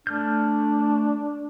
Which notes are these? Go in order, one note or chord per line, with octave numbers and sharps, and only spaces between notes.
A3 D4 F6 G6